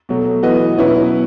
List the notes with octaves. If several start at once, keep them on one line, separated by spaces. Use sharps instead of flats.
B2 F#3 A3
E3 B3 F#4 B4 D#5
B2 F#3 C#4 E4 B4